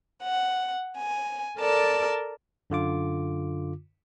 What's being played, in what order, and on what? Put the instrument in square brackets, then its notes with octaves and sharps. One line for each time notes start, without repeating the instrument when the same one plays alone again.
[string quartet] F#5
G#5
A4 A#4 D5 A5
[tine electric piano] F#2 D3 F4 D6